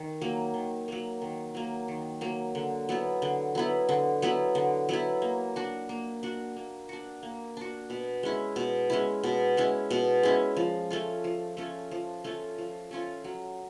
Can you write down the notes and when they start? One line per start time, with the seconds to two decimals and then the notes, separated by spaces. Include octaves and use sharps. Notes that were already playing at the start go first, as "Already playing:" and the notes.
Already playing: D#3
0.22 F#3 A#3
0.54 D#3
0.88 F#3 A#3
1.22 D#3
1.55 F#3 A#3
1.88 D#3
2.21 F#3 A#3
2.55 D3
2.89 F#3 B3 E4
3.22 D3
3.55 F#3 B3 E4
3.89 D3
4.22 F#3 B3 E4
4.55 D3
4.89 F#3 B3 E4
5.22 A#3
5.56 D4 F#4
5.89 A#3
6.23 D4 F#4
6.56 A#3
6.89 D4 F#4
7.23 A#3
7.57 D4 F#4
7.90 B2
8.23 G#3 C#4 E4
8.56 B2
8.90 G#3 C#4 E4
9.24 B2
9.57 G#3 C#4 E4
9.91 B2
10.23 G#3 C#4 E4
10.57 F3
10.91 A3 C#4 F4
11.24 F3
11.57 A3 C#4 F4
11.91 F3
12.24 A3 C#4 F4
12.58 F3
12.91 A3 C#4 F4
13.24 F#3